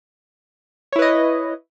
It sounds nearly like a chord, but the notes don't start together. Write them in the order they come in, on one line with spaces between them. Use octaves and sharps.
C#5 E4 B4 D#5